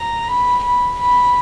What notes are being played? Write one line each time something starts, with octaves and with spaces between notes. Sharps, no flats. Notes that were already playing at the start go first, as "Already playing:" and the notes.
Already playing: A#5
B5
B5
B5